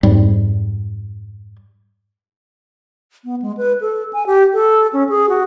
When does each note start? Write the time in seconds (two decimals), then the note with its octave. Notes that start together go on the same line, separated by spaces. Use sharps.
0.03 F2 G#2 G3
3.24 B3
3.42 G#3
3.57 B4
3.81 A4
4.13 G#5
4.26 G4
4.53 A4
4.93 C#4
5.09 G#4
5.29 F#4